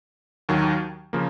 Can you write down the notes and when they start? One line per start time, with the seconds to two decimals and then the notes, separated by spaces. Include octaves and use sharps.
0.49 D#2 D#3 F#3
1.13 C#3 F3 A#3